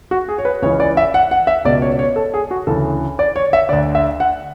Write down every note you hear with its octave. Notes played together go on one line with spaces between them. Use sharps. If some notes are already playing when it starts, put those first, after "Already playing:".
F#4
G#4
C#5
B4
C#2 C#3 E3 C#5
D5
E5
F#5
F#5
E5
C#2 B2 D5
C#5
C#5
A4
G#4
F#4
D2 C#3 E3 A4
D5
C#5
E5
D2 D3 D5
E5
F#5